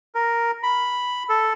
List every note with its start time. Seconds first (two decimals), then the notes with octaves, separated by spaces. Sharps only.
0.15 A#4
0.63 B5
1.29 A4